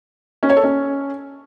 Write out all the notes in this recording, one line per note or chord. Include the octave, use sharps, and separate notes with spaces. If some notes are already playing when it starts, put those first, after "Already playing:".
C#4
C#5
A4
C#4